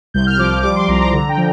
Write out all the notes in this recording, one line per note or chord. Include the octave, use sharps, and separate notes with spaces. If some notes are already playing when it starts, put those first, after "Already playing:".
C2 G6
F6
F3 D6
G3 D6
C6
C2 A#5
A#5
D3 A#5
G5
F3